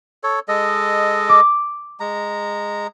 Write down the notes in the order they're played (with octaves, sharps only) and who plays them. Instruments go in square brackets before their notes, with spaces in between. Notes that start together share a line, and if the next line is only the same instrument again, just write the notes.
[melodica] A4 C#5
G#3 A4 D#5
[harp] D6
[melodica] G#3 A#5